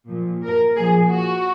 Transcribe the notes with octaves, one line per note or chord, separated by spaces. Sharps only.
A#2 F3
A#4
A#2 F3 G#4
F#4